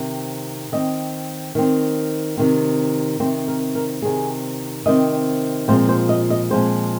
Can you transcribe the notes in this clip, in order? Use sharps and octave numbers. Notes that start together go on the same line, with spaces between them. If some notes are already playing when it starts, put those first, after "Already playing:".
Already playing: C3 D#3 C4
D#3 C4 D#5
D#3 C4
C3 D#3 C4
C3 D#3 C4 C5
A#4
A#4
C3 D#3 C4 G#4
C3 D#3 C4 D#5
A#2 F3 G#3 C4 C5
C5
D#5
D#5
A#2 F3 G#3 C4 C5